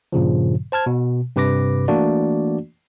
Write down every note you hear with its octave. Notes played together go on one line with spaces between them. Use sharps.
G2 A#2 C#3 F3
C5 A5 F6 G#6
B2
G2 C3 B4 D6 A#6
E3 A3 A#3 D4 F#4 D5